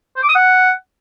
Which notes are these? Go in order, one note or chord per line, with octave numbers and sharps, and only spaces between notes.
C5
D6
D#6
F#5